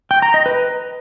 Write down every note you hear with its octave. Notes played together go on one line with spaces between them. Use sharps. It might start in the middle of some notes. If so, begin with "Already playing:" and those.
G5
A#5
D#5
B4